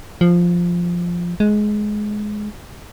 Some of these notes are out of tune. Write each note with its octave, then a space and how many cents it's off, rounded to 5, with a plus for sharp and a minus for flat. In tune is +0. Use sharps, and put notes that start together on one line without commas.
F3 +0
G#3 +15